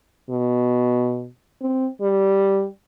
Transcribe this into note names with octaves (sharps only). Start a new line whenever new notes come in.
B2
C4
G3